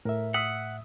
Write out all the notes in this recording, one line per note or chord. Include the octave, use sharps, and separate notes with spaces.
A2 A#4 E5
F#5 D#6 E6 B6